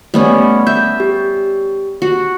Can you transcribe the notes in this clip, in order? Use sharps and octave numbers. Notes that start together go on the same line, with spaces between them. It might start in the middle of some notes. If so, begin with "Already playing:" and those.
G3 A3 B3 C#4
E5 G6
G4
F#4